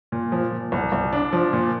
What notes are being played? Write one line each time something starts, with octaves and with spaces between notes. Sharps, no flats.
A#2
F3
A#2
C2
C2
D4
F3
A#2